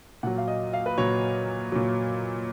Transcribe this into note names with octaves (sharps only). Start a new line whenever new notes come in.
A#2 F#3 F#5
F5
D#5
F5
B4
A#2 F#3 C#5
A#2 F#3